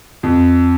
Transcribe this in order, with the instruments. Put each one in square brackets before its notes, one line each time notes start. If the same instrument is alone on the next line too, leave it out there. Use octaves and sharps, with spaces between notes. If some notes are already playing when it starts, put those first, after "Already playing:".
[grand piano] F2